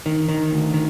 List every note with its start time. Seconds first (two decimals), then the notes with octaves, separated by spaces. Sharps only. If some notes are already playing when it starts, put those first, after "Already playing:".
0.06 D#3
0.28 D#3
0.52 D2
0.74 D#3